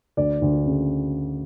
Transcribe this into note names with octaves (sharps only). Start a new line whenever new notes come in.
D2 D5
D2
C#3